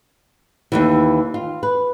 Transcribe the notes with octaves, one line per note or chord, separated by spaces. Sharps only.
D#2 G#2 E3
F4
B4